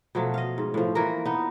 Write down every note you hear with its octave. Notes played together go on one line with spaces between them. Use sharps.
B2 F3 F#3 A3
D#5 F5
G#2
A2 F3
E3 F3 A#3 A#4
B3 D#4